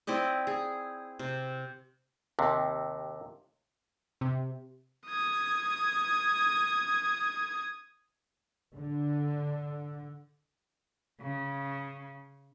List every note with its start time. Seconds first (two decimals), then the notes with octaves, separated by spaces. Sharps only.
0.07 C4 E4 D5 D#5
0.47 G#4
1.19 C3
2.39 D#2 C3
4.21 C3
5.06 D#6 G#6
8.76 D3
11.21 C#3